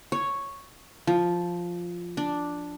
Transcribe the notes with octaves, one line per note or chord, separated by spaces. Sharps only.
C#5
F3
D4